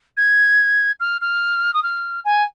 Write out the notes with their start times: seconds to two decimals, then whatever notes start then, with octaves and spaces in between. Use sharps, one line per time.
0.17 G#6
1.00 F6
1.21 F6
1.74 D#6
1.83 F6
2.25 G#5